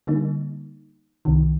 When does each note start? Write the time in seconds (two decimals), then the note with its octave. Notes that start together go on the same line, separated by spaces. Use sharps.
0.07 D3 G3 A#3 D#4
1.25 C2 C3 D#3